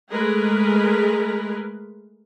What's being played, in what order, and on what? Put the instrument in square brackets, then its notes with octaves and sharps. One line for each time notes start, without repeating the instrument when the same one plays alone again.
[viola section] G#3 A3 G#4 A#4 B4